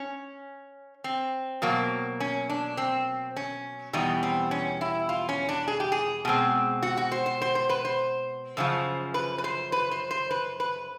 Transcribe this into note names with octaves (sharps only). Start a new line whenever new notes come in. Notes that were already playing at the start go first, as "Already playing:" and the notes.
Already playing: C#4
C4
B2 F#3 A#3
C#4
D4
C4
C#4
E2 B2 G3 D#4
C4
C#4
E4
F4
C#4
D4
G#4
G4
G#4
B2 G#3 C4
F#4
F#4
C5
C5
C5
C5
B4
C5
F#2 C#3 F3
B4
B4
C5
B4
C5
C5
B4
B4